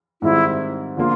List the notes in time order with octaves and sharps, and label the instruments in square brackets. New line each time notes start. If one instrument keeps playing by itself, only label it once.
[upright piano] G#2 D#3 G3 C4 F4 [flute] E4
[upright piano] D3 F3 A#3 [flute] F4